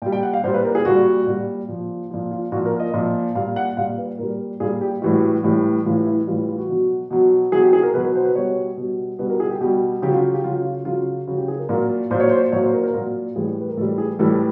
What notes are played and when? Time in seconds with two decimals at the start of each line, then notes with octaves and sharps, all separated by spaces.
0.02 A#2 G5
0.06 G3
0.12 G5
0.23 F#5
0.33 F5
0.44 A#2 G3 C5
0.54 B4
0.64 A#4
0.75 G#4
0.85 A#2 G3 F#4
1.27 A#2 G3
1.69 A#2 F3
2.10 F3 F4
2.14 A#2
2.31 F4
2.52 A#2 F3 F#4
2.66 A#4
2.80 D#5
2.94 A#2 F3
3.35 A#2 G3 F5
3.56 F#5
3.77 A#2 G3 F5
3.98 B4
4.19 A#2 G3 A#4
4.60 A#2 G3 G#4
4.81 G4
5.02 A2 E3 G3 F#4
5.44 A2 E3 G3
5.85 A2 E3 G3 F4
6.06 E4
6.27 A2 E3 G3 F4
6.48 F4
6.58 F#4
6.69 B2 F#3
7.10 B2 F#3
7.52 B2 F#3 G#4
7.62 G4
7.73 G#4
7.83 A#4
7.94 B2 B4
7.97 F#3
8.04 B4
8.15 C5
8.25 B4
8.35 B2 G3 C#5
8.77 B2 G3
9.19 B2 G3 B4
9.30 A#4
9.40 G#4
9.50 G4
9.61 B2 G3 G4
10.02 C#3 F#3 G4
10.13 F4
10.34 G4
10.44 C#3 F#3 F4
10.65 F4
10.85 C#3 F#3 F4
11.27 C#3 F#4
11.31 F#3
11.38 G4
11.48 G#4
11.59 A#4
11.69 A#2 F#3 A#4
12.11 A#2 F#3 C5
12.20 C#5
12.29 C5
12.52 A#2 F#3 C#5
12.63 C5
12.73 A#4
12.83 A#4
12.94 A#2 F#3
13.36 A2 E3 G3 G#4
13.60 B4
13.69 A#4
13.77 A2 E3 G3 A4
13.98 G#4
14.19 A2 E3 G3 A4